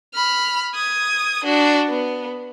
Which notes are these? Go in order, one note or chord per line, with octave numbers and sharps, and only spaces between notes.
B5 F6
D#6 G#6
D4 F#4
B3